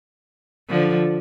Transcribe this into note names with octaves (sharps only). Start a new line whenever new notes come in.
D3 F3